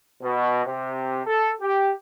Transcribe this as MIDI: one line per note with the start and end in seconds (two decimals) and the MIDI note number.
0.23 0.64 47
0.66 1.21 48
1.26 1.51 69
1.61 1.91 67